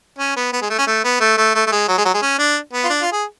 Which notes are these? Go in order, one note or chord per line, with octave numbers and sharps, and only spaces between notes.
C#4
B3
B3
G#3
A3
C#4
A3
B3
A3
A3
A3
A3
G#3
F#3
G#3
F#3
G#3
C#4
D4
B3
F4
D4
F4
G#4